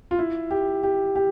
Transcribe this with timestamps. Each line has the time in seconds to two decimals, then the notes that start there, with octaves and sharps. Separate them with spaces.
0.11 F4
0.19 E4
0.51 G4
0.83 G4
1.16 G4